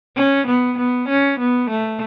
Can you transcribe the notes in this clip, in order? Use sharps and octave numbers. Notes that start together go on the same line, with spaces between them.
C#4
B3
B3
C#4
B3
A3